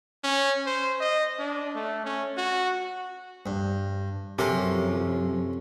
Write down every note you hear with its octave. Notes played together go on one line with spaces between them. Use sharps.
C#4
C5
D#5
D4
A3
C#4
F#4
G2
F#2 C3 F3 C#4 A4 A#4